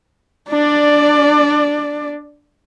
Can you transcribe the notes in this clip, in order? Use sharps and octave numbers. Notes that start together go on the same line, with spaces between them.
D4 D5